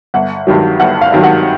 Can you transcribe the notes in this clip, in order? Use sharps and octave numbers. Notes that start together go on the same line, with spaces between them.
G1 F#5
G2 D#3 F#3
G1 F#5
F5
G2 D#3 F#3
F#5